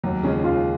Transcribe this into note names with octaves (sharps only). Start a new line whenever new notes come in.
D#2 F#3
C#3 F3 G#3 C#4
D#2 F4